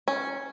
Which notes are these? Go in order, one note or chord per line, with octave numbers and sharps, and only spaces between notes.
C#4